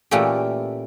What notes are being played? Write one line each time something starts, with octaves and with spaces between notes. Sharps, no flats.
A#2 E3 A3 A#3 C#4 G4